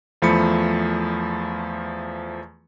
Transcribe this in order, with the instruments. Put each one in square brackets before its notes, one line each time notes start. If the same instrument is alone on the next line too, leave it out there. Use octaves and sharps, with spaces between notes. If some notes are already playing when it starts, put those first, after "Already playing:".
[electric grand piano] E2 F3 A3 B5 C#7